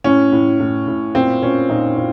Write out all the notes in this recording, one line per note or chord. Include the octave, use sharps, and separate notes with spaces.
A2 C#4
A2
A2
A2
A#2 C4
A#2 C#4
A#2 D#4
A#2